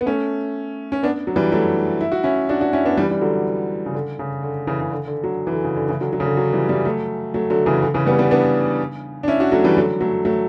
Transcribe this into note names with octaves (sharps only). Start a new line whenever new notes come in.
B3
A3 C#4
C#4
B3 D4
F#3
E3 G3
F#3 A3
E4
F#4
C#4 E4
D4 F#4
D4 F#4
C#4 E4
B3 D4
E3 G3
G3
D3 F#3
C#3
D3
C#3
D3
C#3 E3
C#3
D3
D3
D3 F#3
E3
D3
C#3
D3
C#3 E3
D3 F#3
D3 F#3
C#3
D3
D3 F#3
E3 G3
E3 G3
F#3 A3
F#3 A3
D3 F#3
C#3 E3
D3
C#3 E3
G3 B3
G3 B3
B3 D4
D4
C#4 E4
D4 F#4
F#3 A3
E3 G3
D3 F#3
F#3 A3
F#3 A3